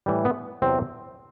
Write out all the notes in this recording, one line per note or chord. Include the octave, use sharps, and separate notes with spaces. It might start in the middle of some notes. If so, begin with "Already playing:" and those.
A2 E3 G3
B3
E2 C3 F#3 C4